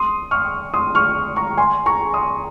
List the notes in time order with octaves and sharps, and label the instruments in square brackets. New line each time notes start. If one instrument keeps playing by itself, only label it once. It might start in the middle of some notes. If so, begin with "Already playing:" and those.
Already playing: [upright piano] C6 D#6
C#6 F6
C6 D#6
C#6 F6
A#5 C#6
G#5 C6
A#5 C#6
C6 D#6